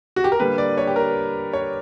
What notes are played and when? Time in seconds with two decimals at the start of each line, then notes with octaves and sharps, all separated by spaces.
0.16 F#4
0.24 G4
0.32 A#4
0.40 D3 G3 A#3 B4
0.58 D5
0.78 C#5
0.87 G4
0.96 A#4
1.53 C#5